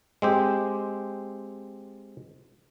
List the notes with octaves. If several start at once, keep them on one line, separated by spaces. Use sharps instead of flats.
G#3 C4 G4